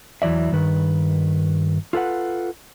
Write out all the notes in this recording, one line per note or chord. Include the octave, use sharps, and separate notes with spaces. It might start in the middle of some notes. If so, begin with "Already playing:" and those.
E2 E3 F#3 D5 E5
G2 D#3 B4
F4 A4 B4 F#5